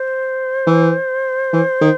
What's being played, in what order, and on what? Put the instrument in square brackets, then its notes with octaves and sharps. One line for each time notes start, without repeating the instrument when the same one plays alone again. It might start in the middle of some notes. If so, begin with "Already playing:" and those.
Already playing: [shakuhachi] C5
[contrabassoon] E3
E3
D#3